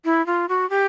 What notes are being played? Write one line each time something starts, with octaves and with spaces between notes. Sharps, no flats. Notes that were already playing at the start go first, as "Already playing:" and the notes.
E4
F4
F#4
G4